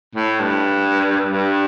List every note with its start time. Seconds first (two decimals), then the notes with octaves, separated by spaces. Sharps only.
0.16 A2
0.40 G2
1.32 G2